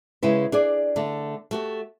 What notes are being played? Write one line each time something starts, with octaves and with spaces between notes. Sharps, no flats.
C#3 G#3 E4 B4
D4 G#4 D5
D3 A3
A3 F#4 G4